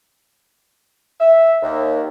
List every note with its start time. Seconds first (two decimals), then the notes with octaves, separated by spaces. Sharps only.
1.20 E5
1.62 D#2